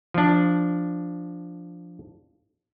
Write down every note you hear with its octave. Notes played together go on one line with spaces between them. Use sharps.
F3 D4